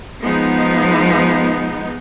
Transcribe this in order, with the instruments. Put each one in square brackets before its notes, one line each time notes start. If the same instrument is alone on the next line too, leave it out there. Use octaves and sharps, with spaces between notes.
[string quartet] F3 [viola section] G#3 B3 D#4